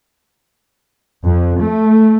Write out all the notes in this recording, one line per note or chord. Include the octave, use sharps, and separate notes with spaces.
F2
A3